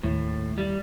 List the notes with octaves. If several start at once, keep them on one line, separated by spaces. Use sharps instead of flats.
D#2 A2
G3